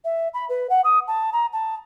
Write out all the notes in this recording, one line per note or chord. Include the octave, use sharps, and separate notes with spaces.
E5
B5
B4
F#5
D#6
A5
A#5
A5